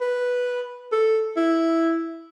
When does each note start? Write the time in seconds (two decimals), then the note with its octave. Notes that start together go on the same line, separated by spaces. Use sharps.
0.01 B4
0.92 A4
1.37 E4